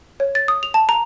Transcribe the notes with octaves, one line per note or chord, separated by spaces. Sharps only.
C#5
A6
D#6
F7
A5
A#5